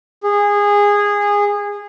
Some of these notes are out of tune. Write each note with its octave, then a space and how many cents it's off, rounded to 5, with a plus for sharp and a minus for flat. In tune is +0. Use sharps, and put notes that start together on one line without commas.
G#4 -20